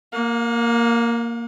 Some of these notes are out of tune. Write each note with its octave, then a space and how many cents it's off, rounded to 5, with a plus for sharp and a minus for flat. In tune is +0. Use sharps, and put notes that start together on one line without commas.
A#3 +0 F5 +45